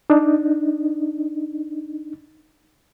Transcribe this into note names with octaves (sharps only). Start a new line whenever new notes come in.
D4 D#4